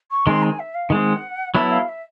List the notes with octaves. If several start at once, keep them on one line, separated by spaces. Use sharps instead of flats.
C#6
D#3 G#3 C4 C6
G#5
E5
F5
D#3 G#3 C4 F#5
F#3 B3 E4 A4 E5
F5
E5